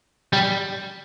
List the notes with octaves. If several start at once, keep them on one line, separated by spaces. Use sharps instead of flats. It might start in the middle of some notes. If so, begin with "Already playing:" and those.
G3